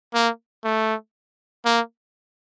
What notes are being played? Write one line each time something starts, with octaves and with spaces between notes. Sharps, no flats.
A#3
A3
A#3